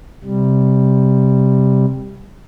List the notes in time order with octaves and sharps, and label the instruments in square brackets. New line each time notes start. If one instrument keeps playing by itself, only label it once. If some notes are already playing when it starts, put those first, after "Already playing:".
[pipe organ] C3 G3